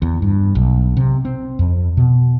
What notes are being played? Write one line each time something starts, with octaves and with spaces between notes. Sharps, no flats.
E2
G2
B1
C3
C4
F2
B2